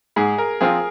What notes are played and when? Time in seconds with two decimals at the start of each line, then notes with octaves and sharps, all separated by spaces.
0.16 G#2 G#4
0.38 A#4
0.61 F3 C4 F4 G#4